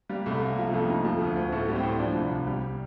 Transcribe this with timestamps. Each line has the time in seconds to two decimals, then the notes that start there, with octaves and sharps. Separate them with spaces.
0.09 G3 A#3
0.26 C2 A3
0.41 C2 A#3
0.57 F3 A#3
0.67 A3
0.73 F2 A#3
0.89 F2 D#4
1.04 F3 A3
1.21 D2
1.36 D2
1.52 A2 A3
1.68 G3
1.76 C4
1.83 A2
1.99 F3 D4
2.16 C2
2.31 C2
2.47 G3